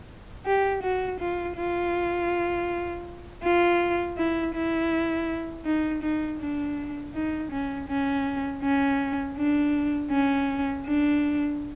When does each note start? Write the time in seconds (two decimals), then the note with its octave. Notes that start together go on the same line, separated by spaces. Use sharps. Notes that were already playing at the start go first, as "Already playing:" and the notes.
0.46 G4
0.83 F#4
1.20 F4
1.57 F4
3.43 F4
4.18 E4
4.54 E4
5.65 D#4
6.03 D#4
6.40 D4
7.14 D#4
7.52 C#4
7.88 C#4
8.63 C#4
9.37 D4
10.11 C#4
10.86 D4